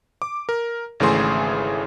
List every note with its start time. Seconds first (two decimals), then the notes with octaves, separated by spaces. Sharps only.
0.22 D6
0.49 A#4
1.00 G#1 C#3 E3 A3 G#4 C6